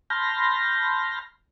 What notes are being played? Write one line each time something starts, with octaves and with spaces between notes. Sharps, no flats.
A5 B5 C6 F6 G6 A#6